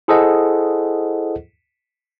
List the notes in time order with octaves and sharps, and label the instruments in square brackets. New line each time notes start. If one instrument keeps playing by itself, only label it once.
[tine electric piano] E4 G#4 A4 C5 D#5 F#5